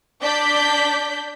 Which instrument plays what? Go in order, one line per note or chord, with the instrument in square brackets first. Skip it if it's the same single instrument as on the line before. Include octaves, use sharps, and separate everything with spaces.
[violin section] D4 D5 G6 B6